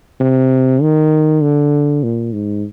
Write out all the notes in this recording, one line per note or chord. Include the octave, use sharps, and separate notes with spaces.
C3
D#3
D3
A#2
G#2